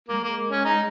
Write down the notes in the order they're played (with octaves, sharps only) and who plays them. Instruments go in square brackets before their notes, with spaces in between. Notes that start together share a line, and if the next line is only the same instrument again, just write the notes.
[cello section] G#3 [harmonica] A#3
[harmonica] A#3
C#4
D#4